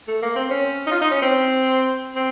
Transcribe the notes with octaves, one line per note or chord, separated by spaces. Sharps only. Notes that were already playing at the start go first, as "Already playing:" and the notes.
A3
A#3
C4
C#4
D#4
F4
D#4
C#4
C4
C4